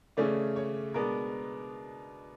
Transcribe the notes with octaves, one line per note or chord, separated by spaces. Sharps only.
C#3 E3 A3 C#4 D5
C#5
B2 G#3 B3 D4 A#4